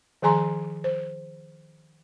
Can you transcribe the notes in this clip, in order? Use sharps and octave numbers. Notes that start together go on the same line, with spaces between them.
D#3 F3 G#4 G#5 A#5 C6
C5